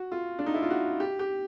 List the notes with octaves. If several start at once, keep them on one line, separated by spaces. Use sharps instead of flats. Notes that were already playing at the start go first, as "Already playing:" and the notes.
Already playing: F#4
F4
D4
D#4
E4
F4
F#4
G4
G4